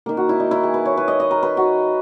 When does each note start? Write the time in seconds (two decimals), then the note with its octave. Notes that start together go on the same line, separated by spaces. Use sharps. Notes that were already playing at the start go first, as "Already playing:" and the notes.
0.06 D#3 A#3 A#4
0.17 F#4
0.29 E4
0.40 D#4
0.51 E4
0.63 G#4
0.74 B4
0.85 C#5
0.97 B4
1.08 D#5
1.20 D#5
1.31 A#4
1.43 B4
1.57 F#4